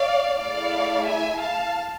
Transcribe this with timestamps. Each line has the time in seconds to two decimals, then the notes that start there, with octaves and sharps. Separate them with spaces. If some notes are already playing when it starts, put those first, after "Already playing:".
Already playing: D5 F5
0.38 A3 E4 G#4 D5 F5
1.06 E5 G#5
1.40 F5 A5